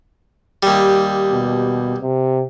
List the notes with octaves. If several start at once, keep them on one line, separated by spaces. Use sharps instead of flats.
D#2 G3
B2
C3